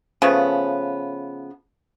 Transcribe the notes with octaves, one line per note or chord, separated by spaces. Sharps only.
C#3 F3 A3 B3